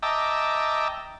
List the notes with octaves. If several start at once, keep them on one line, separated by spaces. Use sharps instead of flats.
D#5 E5 G5 A5 A#5 D6